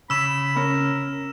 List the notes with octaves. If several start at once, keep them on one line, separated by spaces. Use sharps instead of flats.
C#3 B5 E6 E7
C#4 A#4